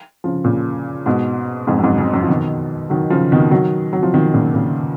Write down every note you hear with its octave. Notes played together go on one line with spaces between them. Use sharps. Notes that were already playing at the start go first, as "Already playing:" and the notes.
C#3 F3
A#2 C#3
G#2 B2
F2 G#2
F#2
F2 G#2
F2
F#2
F3
B2 D#3
D#3 F#3
C#3 F3
B2 D#3
D#3 F#3
F#3
F3
B2 D#3
A#2 C#3
A#2 C#3